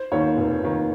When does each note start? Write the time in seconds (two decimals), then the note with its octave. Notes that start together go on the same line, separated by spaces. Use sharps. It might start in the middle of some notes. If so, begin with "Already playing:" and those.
Already playing: C5
0.11 D#2 D#3 C#5
0.37 F1
0.62 D#2 D#3